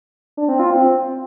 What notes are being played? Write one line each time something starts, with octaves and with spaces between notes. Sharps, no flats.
D4
C4
F4
C4